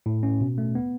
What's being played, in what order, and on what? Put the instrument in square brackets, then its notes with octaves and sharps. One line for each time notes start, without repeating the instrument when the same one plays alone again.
[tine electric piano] A2
C#4
B2
A3
B3